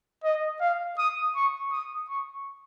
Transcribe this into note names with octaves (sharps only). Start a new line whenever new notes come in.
D#5
F5
D#6
C#6
D#6
C#6